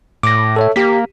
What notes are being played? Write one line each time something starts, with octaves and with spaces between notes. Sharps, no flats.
A2 D6 A#6
A4 C#5 E5
A#3 G4 B6